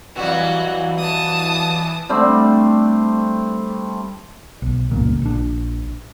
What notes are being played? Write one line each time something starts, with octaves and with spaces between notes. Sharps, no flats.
F2 E3 F#3 G3 F#4
A5 D#6
G3 A3 C4 D4
B1
G1 C#2 A#2
A#1 D4